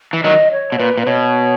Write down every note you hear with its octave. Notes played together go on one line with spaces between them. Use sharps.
E3
D#3 F#3 D#5
C#5
B2
A#2 B4
A#2
B4
B2 C#5